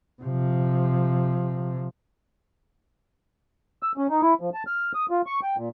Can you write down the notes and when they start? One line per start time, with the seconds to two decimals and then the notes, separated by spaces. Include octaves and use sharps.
0.22 C3 F3
3.83 E6
3.97 C#4
4.10 D#4
4.22 E4
4.41 F3
4.54 A5
4.67 F6
4.95 D#6
5.10 F4
5.26 C#6
5.43 G5
5.57 A#2